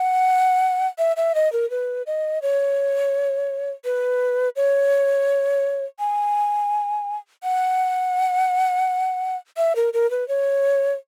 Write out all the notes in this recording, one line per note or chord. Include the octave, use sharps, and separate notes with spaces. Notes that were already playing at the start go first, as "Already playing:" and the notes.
Already playing: F#5
E5
E5
D#5
A#4
B4
D#5
C#5
B4
C#5
G#5
F#5
E5
A#4
A#4
B4
C#5